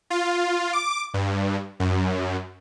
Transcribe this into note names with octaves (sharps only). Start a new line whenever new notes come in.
F4
D6
G2
F#2